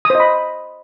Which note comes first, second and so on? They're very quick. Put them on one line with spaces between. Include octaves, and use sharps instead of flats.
D#6 C5 D#5 B5